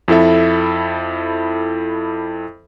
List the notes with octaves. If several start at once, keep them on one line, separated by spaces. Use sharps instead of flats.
F2 E4 A4 E5